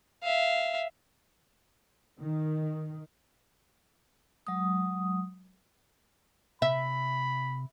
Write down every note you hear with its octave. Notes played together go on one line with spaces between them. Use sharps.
E5 F5
D#3
F#3 G#3 D#6
C3 E5 B5